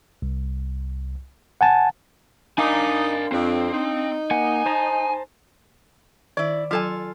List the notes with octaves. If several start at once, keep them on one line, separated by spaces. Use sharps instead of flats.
C2
F#5 G#5 A5
D4 D#4 A#4 F5 G#5 D6
F2 C4
D#4
A#3 F#5 G#5
C5 A5 A#5
D#3 E4 D5
F#3 F4 A4 G#5